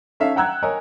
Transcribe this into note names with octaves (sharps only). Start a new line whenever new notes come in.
C#4 D#4 A4 E5 F5
F#5 G5 A#5 E6 F#6 G#6
A#4 C#5 D#5 G#5